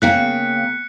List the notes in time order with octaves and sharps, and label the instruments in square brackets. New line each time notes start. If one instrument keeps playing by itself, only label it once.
[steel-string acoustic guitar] C#3 A#3 G5 [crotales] F#6 B6 C#7